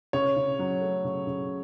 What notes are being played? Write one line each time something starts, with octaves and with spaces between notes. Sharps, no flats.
C#3 C#5
C#3
F#3
A3
C#3
C#3